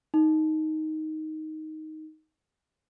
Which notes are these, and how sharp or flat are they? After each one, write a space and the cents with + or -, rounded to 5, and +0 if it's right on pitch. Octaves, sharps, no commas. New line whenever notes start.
D#4 +5